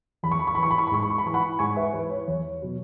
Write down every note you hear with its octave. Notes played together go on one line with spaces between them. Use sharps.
E2 B5
C#6
B5
C#6
E3 B5
C#6
B5
C#6
B5
G#2 C#6
B5
C#6
B5
E3 C#6
F#5 B5
G#2 G#5 C#6
B4 E5
E3 B4
C#5
E2 C#5
B2 F#3